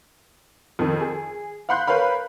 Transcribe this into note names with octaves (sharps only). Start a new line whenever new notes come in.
F2 D#3
G#4
F5 F#5 B5 C6 F#6 G6
A#4 B4 C#5 F5 B5